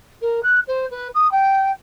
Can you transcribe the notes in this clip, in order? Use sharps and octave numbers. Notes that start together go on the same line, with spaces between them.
A#4
F#6
C5
B4
D#6
G5